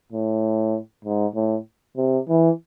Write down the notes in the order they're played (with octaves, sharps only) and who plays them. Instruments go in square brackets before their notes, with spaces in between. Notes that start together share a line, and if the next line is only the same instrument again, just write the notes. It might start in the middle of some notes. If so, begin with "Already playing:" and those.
[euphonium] A2
G#2
A2
C3
E3